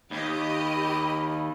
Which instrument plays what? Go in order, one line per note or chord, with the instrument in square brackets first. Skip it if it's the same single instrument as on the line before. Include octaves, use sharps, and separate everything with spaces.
[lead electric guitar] D#2 [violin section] G4 D#5 [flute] B5